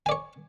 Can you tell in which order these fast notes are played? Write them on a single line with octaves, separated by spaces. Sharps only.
G#5 D5 C#5